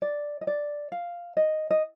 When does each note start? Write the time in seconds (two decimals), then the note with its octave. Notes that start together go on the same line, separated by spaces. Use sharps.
0.02 D5
0.41 D#5
0.47 D5
0.92 F5
1.37 D#5
1.71 D#5